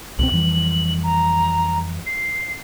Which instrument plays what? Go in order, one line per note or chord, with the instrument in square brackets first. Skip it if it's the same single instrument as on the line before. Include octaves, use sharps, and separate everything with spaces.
[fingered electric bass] C2 B2 C4 [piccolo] F#7
[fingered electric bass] F2 E3 G3
[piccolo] A#5
C7